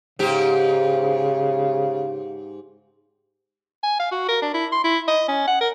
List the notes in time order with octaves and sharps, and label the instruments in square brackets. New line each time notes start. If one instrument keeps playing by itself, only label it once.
[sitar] G#2 G4 [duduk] C#3
[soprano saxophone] G#5
F5
F#4
A#4
D4
E4
C6
E4
D#5
C#4
F#5
A#4